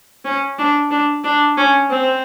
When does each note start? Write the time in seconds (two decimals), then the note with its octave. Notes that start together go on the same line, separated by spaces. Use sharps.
0.25 C#4
0.59 D4
0.91 D4
1.24 D4
1.57 C#4
1.90 C4